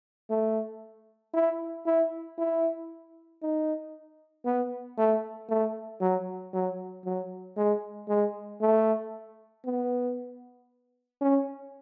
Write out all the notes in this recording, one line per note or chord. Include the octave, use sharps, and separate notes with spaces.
A3
E4
E4
E4
D#4
B3
A3
A3
F#3
F#3
F#3
G#3
G#3
A3
B3
C#4